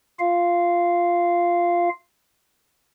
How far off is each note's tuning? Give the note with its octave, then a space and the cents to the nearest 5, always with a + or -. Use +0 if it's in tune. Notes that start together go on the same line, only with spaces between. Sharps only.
F4 +0 F5 -10